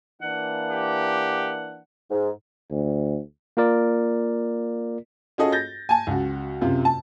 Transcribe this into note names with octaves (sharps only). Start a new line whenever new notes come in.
E3 A#3 D4 F#5
G4
G#2
D2
A#3 F4 A#4 D5
C#4 F4 F#4 G#4 A4 D#5
G6 A6 A#6
G#5 A5
C#2 F#4
F#2 C3 F4
A5